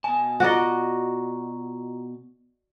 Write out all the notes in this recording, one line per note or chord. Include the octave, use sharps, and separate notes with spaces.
B2 G#5 A5
F4 F#4 D5 D#5 A#5